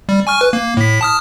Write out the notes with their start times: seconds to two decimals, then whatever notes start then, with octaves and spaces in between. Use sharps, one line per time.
0.09 G3
0.27 G#5 C#6 F6
0.41 B4
0.53 A#3
0.77 A2 B6
1.01 A5 D#6 F6